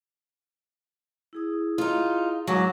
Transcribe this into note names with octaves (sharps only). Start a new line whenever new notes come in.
E4 G#4 D#6
D#4 F4
G#2 F#3 G#5 A#5 D6